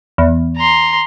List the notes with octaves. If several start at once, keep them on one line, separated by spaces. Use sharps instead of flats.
E2
A#5 C6